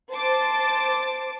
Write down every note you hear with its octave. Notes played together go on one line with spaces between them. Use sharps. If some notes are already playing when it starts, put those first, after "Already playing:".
C5 A5 D6